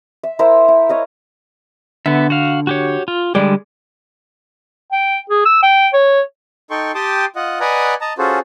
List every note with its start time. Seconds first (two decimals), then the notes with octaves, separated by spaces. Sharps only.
0.23 E5
0.39 E4 A#4 C5 E5
0.68 E4
0.89 C#5 D#5 F5
2.06 D3 B3 E5
2.30 F#4 F5
2.67 F#4 G4 C#5
3.08 F4
3.35 D3 G3 G#3 G4 D5
4.92 G5
5.30 G#4
5.45 E6
5.62 G5
5.93 C#5
6.71 D#4 A4 G5 C6 C#6
6.95 G4 G5 A5 C6 D6 D#6
7.36 F4 D#5 F#5
7.60 B4 D5 D#5 F#5 G#5 A#5
8.01 D#5 A5 A#5
8.18 C#4 F4 F#4 G#4 A4 C5